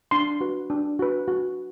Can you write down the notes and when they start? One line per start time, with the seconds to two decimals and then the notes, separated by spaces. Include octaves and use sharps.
0.11 D4 C6
0.41 F#4 B4
0.70 D4
0.99 F#4 B4
1.28 F#4